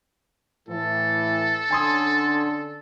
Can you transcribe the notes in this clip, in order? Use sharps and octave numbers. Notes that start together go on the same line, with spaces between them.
A2 E3 A4
D3 C#4 D4 G#5 C6 D#6